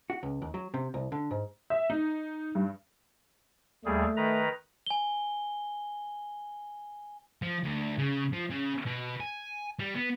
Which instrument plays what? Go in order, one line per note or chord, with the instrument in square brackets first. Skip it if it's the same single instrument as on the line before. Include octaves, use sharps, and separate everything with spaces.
[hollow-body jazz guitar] F#4
C#2
D#2
F#3
C3
C2
D3
G#2
[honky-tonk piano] E5
D#4
G2
[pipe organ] D#2 G3 G#4 [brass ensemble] A3
[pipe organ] D#3 B4 A#5
[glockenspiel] G#5 G7
[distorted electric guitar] F3
D2
C#3
F3
C#3
B2
G#5
G3
B3